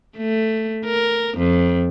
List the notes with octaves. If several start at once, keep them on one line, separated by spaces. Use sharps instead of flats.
A3
A#4
F2